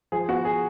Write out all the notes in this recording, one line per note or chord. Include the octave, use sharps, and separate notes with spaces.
F3 G#4
B3 F#4
G#4